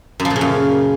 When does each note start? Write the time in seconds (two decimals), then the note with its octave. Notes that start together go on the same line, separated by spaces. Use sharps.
0.20 F#2
0.25 F3
0.30 A#2
0.36 C#3
0.41 F#2